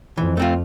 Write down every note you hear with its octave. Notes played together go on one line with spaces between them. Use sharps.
F2 E3
A3 C4 F4